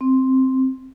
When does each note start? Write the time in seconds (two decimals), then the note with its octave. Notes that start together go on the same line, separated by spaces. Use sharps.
0.01 C4